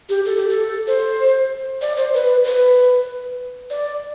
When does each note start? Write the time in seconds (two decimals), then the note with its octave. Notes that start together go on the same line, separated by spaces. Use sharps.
0.09 G4
0.26 A4
0.37 G4
0.49 A4
0.88 C5
1.82 D5
1.97 C5
2.14 B4
2.44 B4
3.70 D5